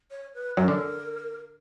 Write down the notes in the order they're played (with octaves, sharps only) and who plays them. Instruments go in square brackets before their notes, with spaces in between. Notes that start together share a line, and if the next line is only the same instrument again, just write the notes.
[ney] C#5
B4
[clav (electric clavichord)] F#2 F#3 [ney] A#4
[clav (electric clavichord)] D3